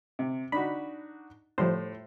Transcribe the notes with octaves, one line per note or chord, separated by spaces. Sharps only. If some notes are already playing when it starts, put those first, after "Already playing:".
C3
D4 D#4 F#4 B5
A2 F3 G3 C5